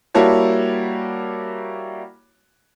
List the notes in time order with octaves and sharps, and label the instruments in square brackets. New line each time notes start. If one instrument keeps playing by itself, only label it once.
[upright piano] G3 A#3 E4 F#4 C#5 A5